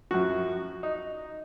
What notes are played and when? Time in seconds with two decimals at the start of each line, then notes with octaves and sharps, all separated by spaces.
0.11 F#2 F3 F#4
0.83 D#4